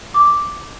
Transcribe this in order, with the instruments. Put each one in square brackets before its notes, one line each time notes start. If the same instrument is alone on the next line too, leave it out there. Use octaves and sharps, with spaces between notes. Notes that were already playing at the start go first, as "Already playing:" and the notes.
[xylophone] D6